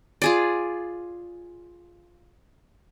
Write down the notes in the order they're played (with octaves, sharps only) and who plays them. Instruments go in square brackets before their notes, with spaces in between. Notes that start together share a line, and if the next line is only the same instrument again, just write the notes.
[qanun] F4 G#4 D5